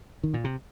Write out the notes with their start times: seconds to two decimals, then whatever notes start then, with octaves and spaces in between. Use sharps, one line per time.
0.24 D#3
0.34 A#2
0.44 C3